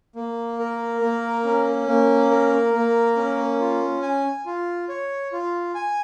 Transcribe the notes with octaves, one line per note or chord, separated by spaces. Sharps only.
A#3
A#4
A#3
C#4
A#3
A#4
A#3
C#4
F4
G#5
F4
C#5
F4
G#5